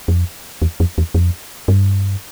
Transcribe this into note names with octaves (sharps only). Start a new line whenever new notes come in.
F2
E2
F2
E2
F2
G2